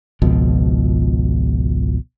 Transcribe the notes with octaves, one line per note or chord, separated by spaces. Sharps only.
G#1 C#2 B2 F3